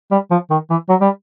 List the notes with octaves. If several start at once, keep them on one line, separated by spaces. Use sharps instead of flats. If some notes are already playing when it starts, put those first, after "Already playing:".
G3
F3
D#3
E3
F#3
G3